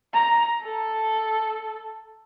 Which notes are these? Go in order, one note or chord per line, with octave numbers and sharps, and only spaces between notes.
A#5
A4